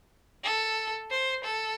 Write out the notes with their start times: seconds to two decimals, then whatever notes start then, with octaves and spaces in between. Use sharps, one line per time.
0.44 A4
1.11 C5
1.44 A4